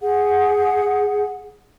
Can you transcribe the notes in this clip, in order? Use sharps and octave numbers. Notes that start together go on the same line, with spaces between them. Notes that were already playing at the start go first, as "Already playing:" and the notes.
G#4 F#5